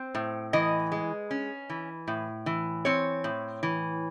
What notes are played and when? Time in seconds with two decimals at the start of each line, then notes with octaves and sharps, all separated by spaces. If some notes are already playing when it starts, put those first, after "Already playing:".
Already playing: C4 C5
0.15 A2
0.53 E3 D#5
0.92 G#3
1.31 C#4
1.70 E3
2.08 A2
2.46 E3
2.85 C4 C#5
3.24 A2
3.63 E3